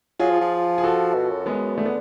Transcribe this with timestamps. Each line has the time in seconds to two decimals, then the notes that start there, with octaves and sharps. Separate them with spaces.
0.19 F#3 F4 G#4
0.30 F3
0.41 F3
0.78 G#4
0.84 F#4 A4
1.14 B2
1.31 F#2
1.46 G#3 B3
1.78 D3 A3
1.86 B3